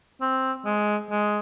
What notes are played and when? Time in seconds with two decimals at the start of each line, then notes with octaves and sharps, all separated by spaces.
0.21 C4
0.65 G#3
1.10 G#3